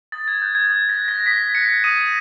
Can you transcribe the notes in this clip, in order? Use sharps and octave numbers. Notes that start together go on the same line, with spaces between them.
D#6 A6
G#6
F#6 G6
G#6
D#6 A6
A#6
F#6
A#6
D#6 B6
F#6 C#7
D#6 D#7